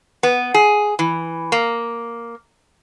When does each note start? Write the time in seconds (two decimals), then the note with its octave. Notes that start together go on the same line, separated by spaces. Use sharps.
0.23 B3
0.54 G#4
0.99 E3
1.52 A#3